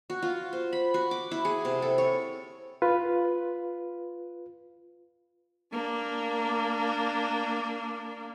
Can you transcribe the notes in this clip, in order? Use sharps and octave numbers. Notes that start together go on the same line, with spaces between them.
F#4
F4
C5
B5
F#4
D6
E4
G#4
C3
A4
C#5
F4 B4
A#3 D4